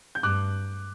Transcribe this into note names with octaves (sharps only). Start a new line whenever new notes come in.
G6
G2 D6 F#6